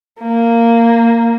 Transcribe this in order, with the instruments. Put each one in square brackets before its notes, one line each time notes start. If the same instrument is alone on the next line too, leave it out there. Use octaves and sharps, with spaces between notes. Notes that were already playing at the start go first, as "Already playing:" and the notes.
[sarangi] A#3